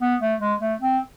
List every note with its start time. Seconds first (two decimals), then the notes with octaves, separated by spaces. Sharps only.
0.02 B3
0.21 A3
0.41 G#3
0.61 A3
0.80 C4